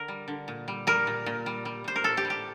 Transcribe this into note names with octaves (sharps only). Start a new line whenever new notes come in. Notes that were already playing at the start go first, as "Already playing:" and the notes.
Already playing: D3 A#4
G3
D3
A#2
G3
G3 A#4
A#2
A#2
G3
G3
A#2 C5
A#4
A2 A4
G4
G3
G4